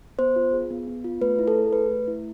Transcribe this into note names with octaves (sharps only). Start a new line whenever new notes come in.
B3 C5
F4
G#4
B3
B3
F4
A3 B4
E4
A4
G#4
A3 B4
A3
E4